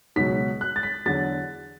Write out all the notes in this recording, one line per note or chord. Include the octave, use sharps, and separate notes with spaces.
C#2 B2 F#3 B6
F#6
A6
B6
E2 D3 F#3 A6